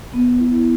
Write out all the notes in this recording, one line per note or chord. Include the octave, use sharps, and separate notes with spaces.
B3
E4